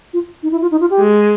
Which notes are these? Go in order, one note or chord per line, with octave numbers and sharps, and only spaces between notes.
F4
D#4
E4
F4
D#4
F4
G4
G#3